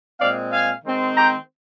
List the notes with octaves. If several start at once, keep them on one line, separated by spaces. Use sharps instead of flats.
A#2 G#3 C4 D5 F5
F5 G#5
D#3 G#3 C4
G5 A#5